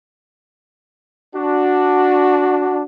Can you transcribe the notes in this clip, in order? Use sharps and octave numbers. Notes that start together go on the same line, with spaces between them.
D4 F#4